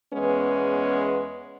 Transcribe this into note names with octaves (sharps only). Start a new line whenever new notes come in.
E2 G#3 B3 C#4 B4